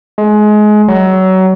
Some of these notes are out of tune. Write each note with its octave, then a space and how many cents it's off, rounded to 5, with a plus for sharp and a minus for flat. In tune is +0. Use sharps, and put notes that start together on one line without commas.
G#3 +25
F#3 +25